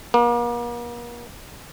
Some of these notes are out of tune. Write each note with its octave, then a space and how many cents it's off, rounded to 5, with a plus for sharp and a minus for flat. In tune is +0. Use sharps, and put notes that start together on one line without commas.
A#3 +40